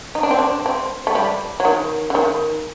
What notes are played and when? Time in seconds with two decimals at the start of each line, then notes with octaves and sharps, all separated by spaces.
0.15 D#4
0.23 D4
0.31 C4
0.39 D4
0.66 C4
1.07 A3
1.15 G3
1.60 F#3
1.65 D#3
2.10 D3
2.15 D#3